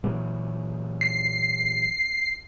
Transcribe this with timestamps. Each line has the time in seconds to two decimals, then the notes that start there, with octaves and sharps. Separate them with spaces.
0.04 A#2 E3 F#3
1.01 C7